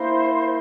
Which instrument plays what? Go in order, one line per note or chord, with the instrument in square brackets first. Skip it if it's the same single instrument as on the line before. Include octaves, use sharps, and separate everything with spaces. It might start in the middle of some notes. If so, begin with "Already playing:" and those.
Already playing: [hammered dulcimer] A#3 E4 A#4 [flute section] C5